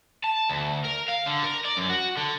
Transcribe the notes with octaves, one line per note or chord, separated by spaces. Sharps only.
A5
D2
A#4
F5
D3
A#4
D5
F#2
F#4
D3